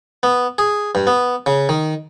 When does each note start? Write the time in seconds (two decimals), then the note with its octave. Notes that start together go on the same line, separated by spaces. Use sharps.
0.23 B3
0.58 G#4
0.95 G2
1.07 B3
1.46 C#3
1.69 D#3